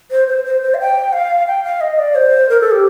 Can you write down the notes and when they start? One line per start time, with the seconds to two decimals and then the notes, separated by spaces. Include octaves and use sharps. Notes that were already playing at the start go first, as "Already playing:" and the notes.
0.11 C5
0.28 C5
0.45 C5
0.63 C5
0.74 F5
0.80 G5
1.13 F5
1.47 G5
1.64 F5
1.81 D#5
1.99 D5
2.15 C5
2.49 A#4
2.61 A4
2.71 G4